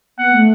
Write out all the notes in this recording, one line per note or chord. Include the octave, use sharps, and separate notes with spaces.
B3 F#5
A3